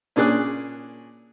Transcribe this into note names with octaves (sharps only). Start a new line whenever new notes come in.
A#2 C#4 D4 G#4 D6 F#6